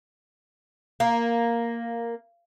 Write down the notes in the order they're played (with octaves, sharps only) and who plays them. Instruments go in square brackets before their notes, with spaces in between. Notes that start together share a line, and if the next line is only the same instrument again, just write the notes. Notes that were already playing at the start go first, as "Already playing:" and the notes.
[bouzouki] A#3